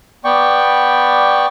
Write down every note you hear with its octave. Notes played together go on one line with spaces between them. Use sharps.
B3 D5 G5 C#6